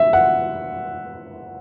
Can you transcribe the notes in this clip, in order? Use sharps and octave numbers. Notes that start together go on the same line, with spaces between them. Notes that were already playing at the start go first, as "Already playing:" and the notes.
Already playing: E5
F#5